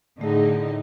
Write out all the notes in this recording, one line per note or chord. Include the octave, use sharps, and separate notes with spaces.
A2 D3 A3 D#4 G#4